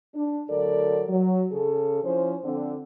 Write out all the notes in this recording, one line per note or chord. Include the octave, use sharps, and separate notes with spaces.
D4
D2 F#3 A4 A#4 D5
F#3
C#3 G#4 A4
F3 C#4 E4 C5
D3 F3 C4